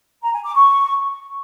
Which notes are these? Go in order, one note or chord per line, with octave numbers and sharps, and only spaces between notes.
A#5
G#5
D6
C#6